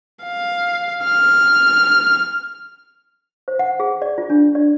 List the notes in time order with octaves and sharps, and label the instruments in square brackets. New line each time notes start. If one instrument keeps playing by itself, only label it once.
[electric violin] F5
F6
[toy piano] C5
F#5
G#4
D5
F4
D4
D5